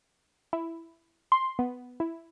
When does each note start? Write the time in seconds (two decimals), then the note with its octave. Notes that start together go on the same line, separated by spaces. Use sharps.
0.53 E4
1.32 C6
1.59 B3
2.00 E4